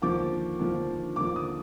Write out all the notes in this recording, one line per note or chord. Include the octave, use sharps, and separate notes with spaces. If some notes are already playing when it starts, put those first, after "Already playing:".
D#2 D3 F3 D6
D#2 D3 F3
D#2 D3 F3 D6
D#6